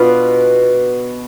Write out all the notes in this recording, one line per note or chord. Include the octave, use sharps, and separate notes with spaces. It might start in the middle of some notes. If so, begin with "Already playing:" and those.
Already playing: B2 B3 D4 F4